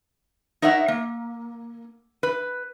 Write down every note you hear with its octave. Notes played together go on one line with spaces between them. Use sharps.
D#4 A#4 C#5 E5 F#5
A#3
B4